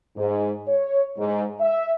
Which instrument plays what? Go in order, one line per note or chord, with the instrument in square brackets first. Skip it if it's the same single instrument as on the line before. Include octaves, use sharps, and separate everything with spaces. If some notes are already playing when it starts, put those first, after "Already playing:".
[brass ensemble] G#2
C#5
G#2
E5